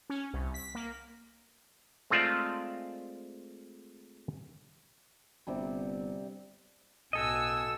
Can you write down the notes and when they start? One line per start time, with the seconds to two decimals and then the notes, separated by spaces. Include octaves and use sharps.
0.10 C#4
0.33 C2
0.54 B6
0.75 A#3
2.10 G#3 A3 C4 F4 D5 E5
5.47 G1 C3 G3
7.13 B1 A2 F#4 A4 D#5 G#5 E6